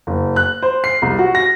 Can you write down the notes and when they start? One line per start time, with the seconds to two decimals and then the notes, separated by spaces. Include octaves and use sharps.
0.07 F#1
0.36 F#6
0.62 C5
0.84 C7
1.02 C2
1.19 F#4
1.35 A#6